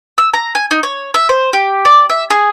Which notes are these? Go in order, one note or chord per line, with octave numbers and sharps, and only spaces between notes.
E6
A#5
G#5
D#4
C#5
E5
C5
G4
D5
E5
G#4